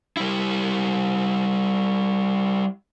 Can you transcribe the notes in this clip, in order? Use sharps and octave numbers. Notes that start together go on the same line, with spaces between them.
G3 E4